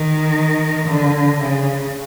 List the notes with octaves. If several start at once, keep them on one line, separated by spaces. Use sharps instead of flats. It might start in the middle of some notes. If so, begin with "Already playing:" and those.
Already playing: D#3
D3
C#3